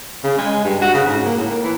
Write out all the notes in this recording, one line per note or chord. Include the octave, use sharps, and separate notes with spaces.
C#3
G#3
G2
F#4
C#3
G#2
A#3
A2
A#3
E3